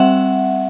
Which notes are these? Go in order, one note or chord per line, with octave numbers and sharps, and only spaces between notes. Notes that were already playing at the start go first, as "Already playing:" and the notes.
Already playing: G3 C4 E5 F#5